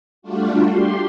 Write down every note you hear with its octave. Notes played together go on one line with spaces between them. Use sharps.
G3 A3 D4 F4 F#4
G4 C6